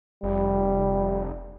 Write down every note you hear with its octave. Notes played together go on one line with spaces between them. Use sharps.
F1 G3